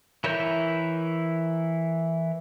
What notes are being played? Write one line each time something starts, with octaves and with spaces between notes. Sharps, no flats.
E3 E4 A#4 C#5 G6